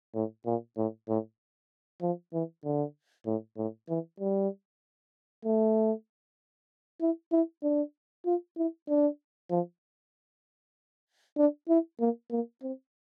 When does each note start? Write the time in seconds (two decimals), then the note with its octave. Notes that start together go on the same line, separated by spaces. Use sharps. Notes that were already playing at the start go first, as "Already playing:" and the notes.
0.15 A2
0.46 A#2
0.77 A2
1.09 A2
2.02 F3
2.33 E3
2.64 D3
3.26 A2
3.57 A2
3.89 E3
4.20 G3
5.45 A3
7.01 E4
7.32 E4
7.63 D4
8.26 F4
8.57 E4
8.88 D4
9.50 F3
11.37 D4
11.69 E4
12.00 A#3
12.31 A#3
12.62 C4